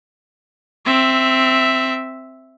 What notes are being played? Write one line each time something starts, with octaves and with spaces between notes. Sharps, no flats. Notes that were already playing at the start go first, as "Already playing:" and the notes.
C4 E5